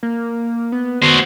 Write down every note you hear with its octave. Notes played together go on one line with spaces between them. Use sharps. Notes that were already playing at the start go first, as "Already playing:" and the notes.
A#3
B3
B3 F#4 C5